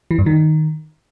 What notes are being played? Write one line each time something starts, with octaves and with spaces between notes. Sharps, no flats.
E3
G2
D#3